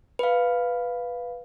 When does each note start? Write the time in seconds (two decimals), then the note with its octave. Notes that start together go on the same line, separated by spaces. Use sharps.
0.19 B4 F5